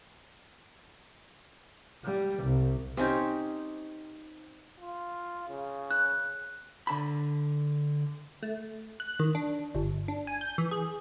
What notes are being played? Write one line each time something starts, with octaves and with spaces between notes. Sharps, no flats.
G3
C2
C4 C#4 D#4 G4
F4
C#3
F#6
D3 A5 B5
A3
F#6
D#3
D4
G1
D4
G#5
G6
E3
G#4